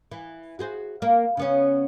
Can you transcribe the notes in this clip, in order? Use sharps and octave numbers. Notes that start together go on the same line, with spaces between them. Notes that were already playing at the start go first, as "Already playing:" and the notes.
E3
F#4 G#4 C5
A#3
C#3 B3 C#4